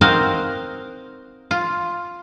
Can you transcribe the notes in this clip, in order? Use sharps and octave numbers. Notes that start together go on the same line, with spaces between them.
C4 D#4 F#4 A#4 C5 F5
F4